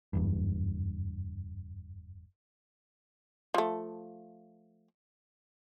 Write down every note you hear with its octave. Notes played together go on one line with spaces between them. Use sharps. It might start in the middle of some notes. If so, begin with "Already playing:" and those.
F#1 E2 G2
F3 A3